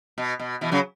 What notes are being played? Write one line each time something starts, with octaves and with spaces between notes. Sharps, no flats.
B2
B2
B2 E3
C#3 F#3